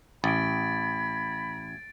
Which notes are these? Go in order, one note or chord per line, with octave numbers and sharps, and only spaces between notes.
A1 B5 G#6 A6 D7